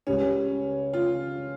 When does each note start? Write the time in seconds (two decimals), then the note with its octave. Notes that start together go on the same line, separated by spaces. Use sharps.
0.07 C#2 C#3 G3 C#4
0.93 F4